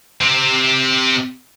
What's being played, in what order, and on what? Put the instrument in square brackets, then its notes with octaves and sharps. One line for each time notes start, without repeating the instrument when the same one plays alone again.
[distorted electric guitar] C3 C4